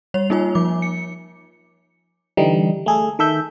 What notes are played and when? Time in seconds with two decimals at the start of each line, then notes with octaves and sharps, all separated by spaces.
0.14 G3 C#5 F7
0.30 A#3 D#4 F4 C#5 G#5
0.55 F3 D6
0.82 C#7
2.37 D3 E3 G3 D#4
2.86 A3 G#4 A4
3.19 D#3 A4 E5 G6